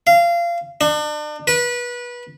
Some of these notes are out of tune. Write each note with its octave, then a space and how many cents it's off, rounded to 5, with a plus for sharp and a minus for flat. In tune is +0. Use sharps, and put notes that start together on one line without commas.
F5 -25
D4 +40
B4 -25